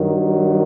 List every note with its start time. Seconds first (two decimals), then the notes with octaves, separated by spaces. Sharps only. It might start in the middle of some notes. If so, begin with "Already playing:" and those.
Already playing: G2 D#3 F#3